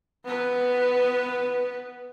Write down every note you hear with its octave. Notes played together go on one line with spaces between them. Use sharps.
B3 B4